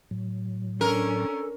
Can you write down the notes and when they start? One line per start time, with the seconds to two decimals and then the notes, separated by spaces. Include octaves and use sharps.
0.11 A2 F#3
0.81 C#4 D4 A4 A#4